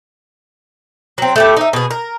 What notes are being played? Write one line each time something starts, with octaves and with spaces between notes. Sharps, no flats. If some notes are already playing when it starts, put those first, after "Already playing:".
F#3 C4
A3 E4 G4
D#4 E5
B2 G#4
A#4